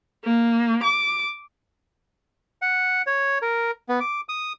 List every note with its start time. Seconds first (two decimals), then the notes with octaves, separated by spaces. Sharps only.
0.24 A#3
0.83 D6
2.62 F#5
3.07 C#5
3.42 A#4
3.89 B3
4.00 D6
4.29 D#6